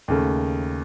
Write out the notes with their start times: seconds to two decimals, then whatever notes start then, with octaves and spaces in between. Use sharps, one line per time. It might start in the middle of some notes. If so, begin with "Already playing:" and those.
0.08 D#2 C#3 A3